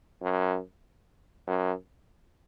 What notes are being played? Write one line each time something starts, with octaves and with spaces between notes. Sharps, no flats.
F#2
F#2